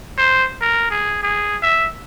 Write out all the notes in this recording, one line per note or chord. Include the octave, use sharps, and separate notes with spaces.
C5
A#4
G#4
G#4
E5